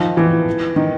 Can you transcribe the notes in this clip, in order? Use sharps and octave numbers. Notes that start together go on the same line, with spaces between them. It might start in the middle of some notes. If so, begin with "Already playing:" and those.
Already playing: D#3 F3
E3
D#3